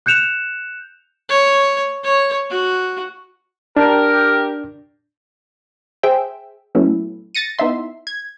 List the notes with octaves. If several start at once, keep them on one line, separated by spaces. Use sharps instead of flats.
F#6 G6 C#7 E7 F7
C#5
C#5
F#4
D4 G4 A#4
G#4 C5 E5 G5
A#2 F#3 A3 B3 C#4 E4
A6 A#6 C#7 D#7
B3 D#4 E4 E5 C6
G#6